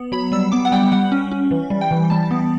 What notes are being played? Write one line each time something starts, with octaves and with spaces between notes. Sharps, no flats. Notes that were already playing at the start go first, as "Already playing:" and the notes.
Already playing: B3
F#3 B5
G3 E6
B3 D6
F#5
G3 G5
G3 F#5
C#4
C#4
E3
G3
G5
E3
G3 A5
B3